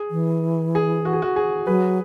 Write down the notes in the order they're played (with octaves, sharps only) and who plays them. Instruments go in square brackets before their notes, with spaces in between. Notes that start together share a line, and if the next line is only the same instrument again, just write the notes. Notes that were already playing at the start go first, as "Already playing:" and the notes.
Already playing: [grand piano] G#4
[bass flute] E3
[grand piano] G#4
F#4
G#4
F#4
G#4
[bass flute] F#3 [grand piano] G#4 B4